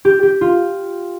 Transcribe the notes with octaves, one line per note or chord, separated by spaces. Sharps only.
G4
G4
F4